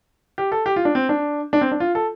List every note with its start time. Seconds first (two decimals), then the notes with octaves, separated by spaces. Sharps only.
0.38 G4
0.52 A4
0.66 G4
0.76 F4
0.85 D4
0.95 C4
1.09 D4
1.53 D4
1.61 C4
1.72 D4
1.80 F4
1.95 A4